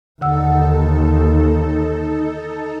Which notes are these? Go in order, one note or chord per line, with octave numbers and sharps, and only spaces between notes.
D#2 D3 D#4 A4 F#5 E6